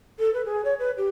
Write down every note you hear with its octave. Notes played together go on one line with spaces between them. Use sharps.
A4
B4
G#4
C#5
B4
G4